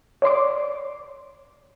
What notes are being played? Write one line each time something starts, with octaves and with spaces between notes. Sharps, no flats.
C#5 D5 C6 D6